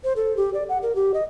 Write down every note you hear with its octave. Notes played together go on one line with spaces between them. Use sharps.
C5
A4
G4
D5
F#5
A#4
G4
D#5